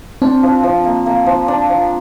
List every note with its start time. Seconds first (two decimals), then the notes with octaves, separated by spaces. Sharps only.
0.22 C4 D4
0.43 F3
0.63 F3
0.85 A#3
1.06 A#3
1.26 F3
1.48 D4
1.69 F3